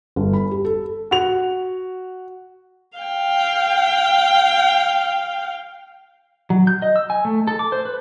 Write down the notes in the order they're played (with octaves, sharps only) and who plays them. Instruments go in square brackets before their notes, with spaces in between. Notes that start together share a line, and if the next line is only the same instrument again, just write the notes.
[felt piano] G1
B5
G4
A4
[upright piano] F#4 F7
[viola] F5 G5
[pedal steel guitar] F#3
G6
D#5
E6
G#5
A3
A4
D6
C5
B4